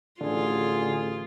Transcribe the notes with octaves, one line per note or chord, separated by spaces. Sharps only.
A1 D3 F4 G#4